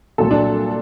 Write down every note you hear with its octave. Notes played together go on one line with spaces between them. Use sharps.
C2 A#2 F#3 A4
D4